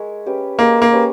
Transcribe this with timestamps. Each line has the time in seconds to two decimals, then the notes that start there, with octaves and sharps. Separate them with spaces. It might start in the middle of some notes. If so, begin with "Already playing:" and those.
Already playing: G#3 A#4 C#5 E5
0.26 C#4 G4 B4
0.59 G#3 A#3
0.82 A#3
0.92 C#4 G4 B4